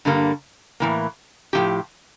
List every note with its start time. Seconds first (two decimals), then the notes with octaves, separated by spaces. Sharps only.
0.05 G2 D3 G3 A#3
0.80 A2 E3 A#3
1.53 A2 F3 C#4 G4